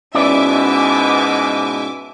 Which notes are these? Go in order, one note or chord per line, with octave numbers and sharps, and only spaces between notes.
G#2 B2 C#4 E4 D5 E5 G#5 D6